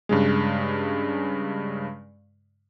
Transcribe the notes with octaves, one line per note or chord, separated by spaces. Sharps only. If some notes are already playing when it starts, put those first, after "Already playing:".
G2 C#3 G#3